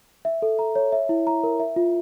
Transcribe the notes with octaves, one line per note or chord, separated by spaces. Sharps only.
E5
A4
A#5
C#5
E5
E4
A#5
A#4
E5
F4